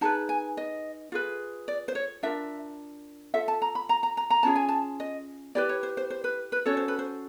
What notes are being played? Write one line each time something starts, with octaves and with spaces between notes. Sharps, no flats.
D#4 G#4 B4 A5
G#5
D#5
F4 G#4 B4
D5
C5
C#5
D4 F4 A#4 E5
F4 A4 E5
A5
A#5
B5
A#5
A#5
A#5
A#5
C#4 F4 G#4 A5
G#5
A5
D#5
E4 G4 B4 D5
C#5
C5
C5
C5
B4
B4
C#4 F#4 A4 C#5
C5
B4
C5